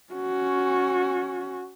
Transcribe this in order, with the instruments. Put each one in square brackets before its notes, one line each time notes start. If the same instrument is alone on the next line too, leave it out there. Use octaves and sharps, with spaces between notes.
[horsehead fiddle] C#4 F#4